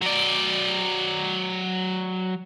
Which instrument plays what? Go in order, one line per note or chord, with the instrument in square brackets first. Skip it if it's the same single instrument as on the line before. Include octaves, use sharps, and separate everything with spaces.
[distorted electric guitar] F#3 D5